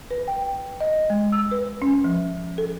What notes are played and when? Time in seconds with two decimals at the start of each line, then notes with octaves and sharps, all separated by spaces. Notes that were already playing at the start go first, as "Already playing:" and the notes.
0.11 B4
0.28 G5
0.81 D#5
1.10 G#3
1.32 E6
1.52 B4
1.82 C#4
2.04 F3
2.58 A4